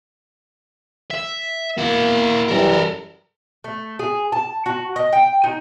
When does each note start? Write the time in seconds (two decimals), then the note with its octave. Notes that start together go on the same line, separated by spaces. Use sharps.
1.11 E5
1.78 A#3 E4 F#4
2.48 F#2 E3 G3 A4 A#4
3.64 A3
3.99 G#4
4.32 A5
4.66 F#4
4.96 D#5
5.13 G5
5.44 D#4